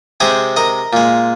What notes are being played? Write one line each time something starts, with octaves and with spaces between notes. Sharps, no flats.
C3 G#3 G#4 C5
A#4 D#5
A#2 G#3